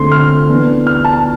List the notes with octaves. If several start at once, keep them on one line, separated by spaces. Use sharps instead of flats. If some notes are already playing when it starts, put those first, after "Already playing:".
Already playing: D3 A3 C4 C6
F6
E3 B3 D4
F6
A5